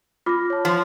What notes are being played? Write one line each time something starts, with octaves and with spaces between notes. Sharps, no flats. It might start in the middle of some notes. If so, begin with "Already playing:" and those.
F4 D6 F6 A#6
C#5 A5
F3 F6